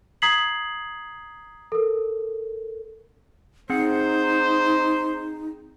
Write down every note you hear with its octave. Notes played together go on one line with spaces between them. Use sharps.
A#5 D#6 G#6 B6 C7 F#7
A4 A#4
C4 D#4 G#4 C5 F#5